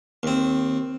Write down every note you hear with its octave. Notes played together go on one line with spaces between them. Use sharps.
D#2 C4